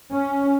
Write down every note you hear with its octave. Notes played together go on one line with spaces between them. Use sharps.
C#4